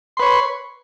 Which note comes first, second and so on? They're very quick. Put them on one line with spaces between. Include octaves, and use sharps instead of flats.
C6 B4 C#5